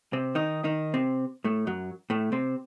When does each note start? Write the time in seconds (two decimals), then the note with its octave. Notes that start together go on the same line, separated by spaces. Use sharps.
0.13 C3 C4
0.35 D#3 D#4
0.64 D#3 D#4
0.94 C3 C4
1.44 A2 A3
1.67 F#2 F#3
2.10 A2 A3
2.32 C3 C4